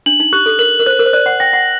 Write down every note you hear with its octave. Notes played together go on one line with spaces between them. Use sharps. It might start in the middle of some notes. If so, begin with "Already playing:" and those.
D4 F#7
D#4
G4 F#6
A4
A#4 F#7
A#4
C5 F#6
A#4
C5
D5 F#6
F#5
G5 A#6
F#5